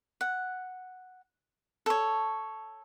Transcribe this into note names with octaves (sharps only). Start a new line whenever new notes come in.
F#5
A4 C#5